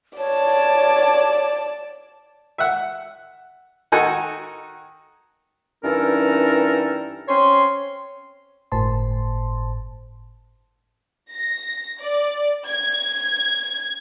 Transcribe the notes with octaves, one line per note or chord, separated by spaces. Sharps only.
C#5 D5 A5
E5 F#5
D#3 D#4 F#4 A4 G#5
G2 E3 C#4 D#4 A4 A#4
C4 C#4 C#5 C6
G1 A2 C5 A5 C6
A#6
D5
G#6